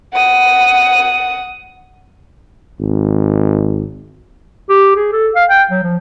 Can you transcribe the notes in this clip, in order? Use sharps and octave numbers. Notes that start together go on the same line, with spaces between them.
F#5 D#6
G#1
G4
G#4
A4
F5
G5
F#3
F3